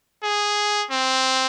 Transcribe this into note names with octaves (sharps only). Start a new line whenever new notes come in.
G#4
C4